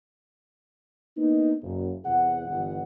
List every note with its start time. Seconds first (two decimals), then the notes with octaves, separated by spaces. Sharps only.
1.17 A#3 B3 D4 D#4
1.62 F#1
2.04 E2 C3 G#4 F#5
2.46 G1 E3 G3 F4 F#5